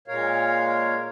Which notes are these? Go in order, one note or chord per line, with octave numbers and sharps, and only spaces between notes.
A#2 G#3 A#4 C#5 F5